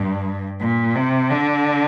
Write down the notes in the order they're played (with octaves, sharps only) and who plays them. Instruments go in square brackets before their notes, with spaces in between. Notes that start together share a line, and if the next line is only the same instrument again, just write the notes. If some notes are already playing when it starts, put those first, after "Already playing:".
Already playing: [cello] G2
A#2
C3
D3